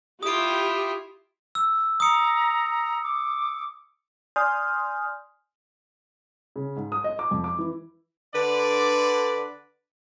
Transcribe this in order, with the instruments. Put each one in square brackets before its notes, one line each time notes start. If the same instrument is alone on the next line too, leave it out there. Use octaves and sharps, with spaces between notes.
[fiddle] E4 F4 [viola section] G4 [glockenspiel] D#6 D7
[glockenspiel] E6
[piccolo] A#5 [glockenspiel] D#6 C#7
[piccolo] D6
[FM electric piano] D5 G#5 C6 D#6 F6 G6
[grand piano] C#3
G#2
D#6
D#5
D6
F2
D6
E3
[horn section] D3 B4 D5